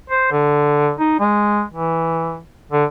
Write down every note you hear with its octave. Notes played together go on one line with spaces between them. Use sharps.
C5
D3
D#4
G#3
E3
D3